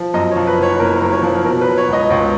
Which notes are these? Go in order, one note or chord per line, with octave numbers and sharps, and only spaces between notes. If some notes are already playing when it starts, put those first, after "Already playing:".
Already playing: F3
F#2 D#5
C#5
F3
B4
F#1 C#5
F#1 A#4
F#2
C#5
F3
B2 A#4
B4
F#3
C#5
C#2 D#5
C#2 C#5